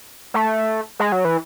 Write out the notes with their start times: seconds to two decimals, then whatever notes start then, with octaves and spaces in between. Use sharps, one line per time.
0.34 A3
1.00 G#3
1.12 F#3
1.25 E3